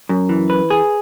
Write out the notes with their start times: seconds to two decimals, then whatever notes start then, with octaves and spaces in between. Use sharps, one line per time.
0.09 F#2
0.29 E3
0.50 B4
0.70 G#4